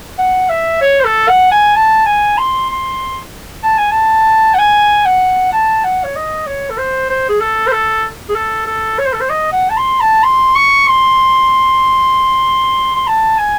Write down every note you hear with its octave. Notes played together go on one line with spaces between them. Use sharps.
F#5
E5
C#5
C5
A4
F#5
G#5
A5
G#5
C6
C6
A5
G#5
A5
F#5
G#5
F#5
A5
F#5
C#5
D#5
C#5
A4
C5
C5
G#4
A4
C5
A4
G#4
A4
A4
C#5
C5
A4
C5
D#5
F#5
A5
C6
A5
C6
C#6
C6
C6
A5
G#5